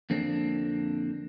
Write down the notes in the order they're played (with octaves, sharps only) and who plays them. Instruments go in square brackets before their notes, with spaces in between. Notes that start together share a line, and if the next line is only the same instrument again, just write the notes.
[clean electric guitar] F2 D3 A#3 C4 D4